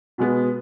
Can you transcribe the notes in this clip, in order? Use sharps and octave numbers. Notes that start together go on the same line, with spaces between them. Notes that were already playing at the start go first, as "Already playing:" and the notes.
B2 G#3 B3